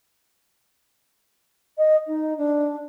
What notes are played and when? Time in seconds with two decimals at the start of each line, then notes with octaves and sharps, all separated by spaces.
1.78 D#5
2.07 D#4
2.37 D4